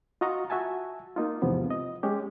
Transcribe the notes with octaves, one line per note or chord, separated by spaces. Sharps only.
F4 F#4 D#5 F5 A#5 C#6
F#4 E5 G#5 A5
A#3 D#4 F4
E2 G#2 C3 F3 B3
D#5
G#3 C#4 G4